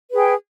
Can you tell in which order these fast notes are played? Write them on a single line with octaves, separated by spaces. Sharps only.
B4 G#4 G5 G#5